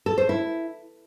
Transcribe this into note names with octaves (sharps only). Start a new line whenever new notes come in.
A4
C5
E4